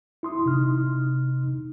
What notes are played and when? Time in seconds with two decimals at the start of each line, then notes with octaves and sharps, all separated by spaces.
0.23 E4 C6 D#6
0.46 C3 D#4 F6